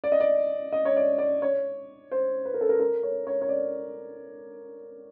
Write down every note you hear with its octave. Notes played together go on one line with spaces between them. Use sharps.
D5
D#5
D5
D#5
C#5
D5
D5
C#5
C5
B4
A#4
A4
A#4
A#4
C#5
C#5
C#5
D5